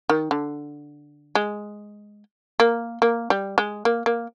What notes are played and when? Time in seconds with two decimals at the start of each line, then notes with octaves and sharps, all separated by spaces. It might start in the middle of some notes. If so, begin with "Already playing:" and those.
0.09 D#3
0.31 D3
1.35 G#3
2.60 A#3
3.02 A#3
3.30 G3
3.58 G#3
3.85 A#3
4.06 A#3